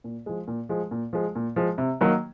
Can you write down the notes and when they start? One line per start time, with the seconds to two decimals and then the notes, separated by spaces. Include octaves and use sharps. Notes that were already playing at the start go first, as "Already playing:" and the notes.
0.04 A#2
0.26 F3 G#3
0.47 A#2
0.69 F3 G#3
0.91 A#2
1.13 F3 G#3
1.35 A#2
1.56 F3 G#3
1.78 C3
2.01 D#3 F#3 A#3 D#4